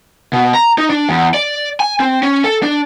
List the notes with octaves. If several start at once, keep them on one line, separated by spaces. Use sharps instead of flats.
B2
A#5
D#4
D4
E2
D5
G#5
C4
C#4
A4
D4